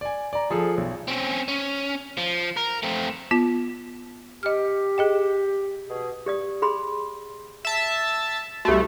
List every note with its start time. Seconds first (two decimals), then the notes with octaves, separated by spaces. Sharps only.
0.01 D5 G#5
0.33 D5 A#5
0.50 F3 G#4 A4
0.77 B1
1.08 C4 C#4
1.48 C#4
2.18 F3
2.57 A#4
2.83 A3 C4
3.31 B3 F4
4.43 G4 D#5 F6
4.98 G#4 D#5 G5
5.88 B2 G#4
6.26 G4 D5 D#6
6.62 G#4 B5 C6
7.65 E5 A5
8.65 C2 A3 F#4 G4